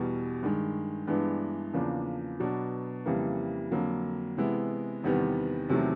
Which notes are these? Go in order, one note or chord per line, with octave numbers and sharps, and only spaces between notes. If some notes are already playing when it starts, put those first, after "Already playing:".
Already playing: E2 B2 G3
G2 D#3 G#3
G2 E3 G#3 B3 D4
E2 C#3 F3 A#3 D4
B2 F#3 B3 D4
F2 C#3 E3 G3 A#3
F2 D3 F#3 A#3
C3 E3 G#3 B3 E4
E2 C3 D#3 G3 B3
E2 C3 D#3 F#3 A3